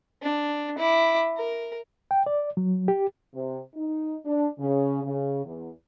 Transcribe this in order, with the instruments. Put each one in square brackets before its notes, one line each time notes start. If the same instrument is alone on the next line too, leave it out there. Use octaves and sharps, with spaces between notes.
[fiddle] D4
E4 D6
A#4
[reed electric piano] G5
D5
F#3
G4
[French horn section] C3
D#4
D4
C#3
C#3
E2